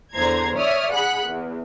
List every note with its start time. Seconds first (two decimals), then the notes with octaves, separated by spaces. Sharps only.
0.15 E2 D3 C5 A#5 G#6
0.57 C#5 D5 E5 D#6 F6
0.93 G#4 F#5 B5 F#6
1.27 E2